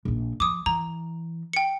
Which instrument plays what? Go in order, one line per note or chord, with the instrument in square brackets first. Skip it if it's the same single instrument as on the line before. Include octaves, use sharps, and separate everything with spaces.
[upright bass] A#1 A#2
[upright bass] F3 [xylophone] D6 D#6
[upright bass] E3 [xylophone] A#5
[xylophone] G5 C#7